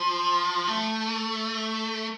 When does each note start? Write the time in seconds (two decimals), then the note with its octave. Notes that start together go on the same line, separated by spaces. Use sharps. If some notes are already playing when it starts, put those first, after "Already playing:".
Already playing: F3
0.67 A3